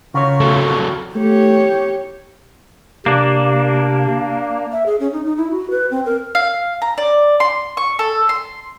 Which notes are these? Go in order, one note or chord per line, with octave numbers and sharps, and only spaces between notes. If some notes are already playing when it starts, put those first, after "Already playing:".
C#3 F4 F#4 A#4 C#5
F#3 A3
A3 G4 C#5
C3 A#3 D4
E5
G#4
C#4
D#4
D#4
E4
F#4
B4
C4
A#4
F5
A#5
D5
C6
C#6
A4
C6